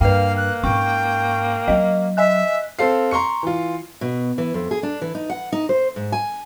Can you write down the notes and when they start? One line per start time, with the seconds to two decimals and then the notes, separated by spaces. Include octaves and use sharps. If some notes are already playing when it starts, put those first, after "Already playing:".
0.01 G2 A#3 B4 F5 G5
0.37 F#6
0.63 G#2 C#4 G5 C#6
1.68 F#3 C#4 D#5
2.17 D#5 E5 G#5 F#6
2.79 C4 A4 F5 C7
3.11 A#5 C6 C#6 C#7
3.43 E3 F4
4.01 B2
4.38 E3
4.54 F2
4.71 G#4
4.83 D4
5.01 E3
5.15 D#4
5.30 F#5
5.52 D#4
5.69 C5
5.96 G#2
6.12 G#5